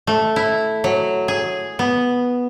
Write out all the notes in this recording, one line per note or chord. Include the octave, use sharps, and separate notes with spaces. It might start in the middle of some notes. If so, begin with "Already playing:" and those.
A3
E4
F#3
G#4
B3